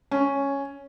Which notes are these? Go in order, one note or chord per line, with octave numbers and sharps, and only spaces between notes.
C#4